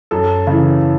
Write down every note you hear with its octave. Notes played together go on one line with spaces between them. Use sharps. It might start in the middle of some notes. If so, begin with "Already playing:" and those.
F#2 A4
C#3 E3